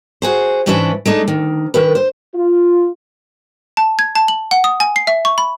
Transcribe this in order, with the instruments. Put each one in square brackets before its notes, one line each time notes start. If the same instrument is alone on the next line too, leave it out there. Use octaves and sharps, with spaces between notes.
[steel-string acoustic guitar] F#4 G#4 C5
G#2 E3 C#4 D4 B4 E5
G#3 A3 D4 D#4
D2 D#3
D#3 A#4 B4
C5
[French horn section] F4
[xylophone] A5
G#6
A5
F#7
F#5
D#6
G#5
C7
E5
C#6
B5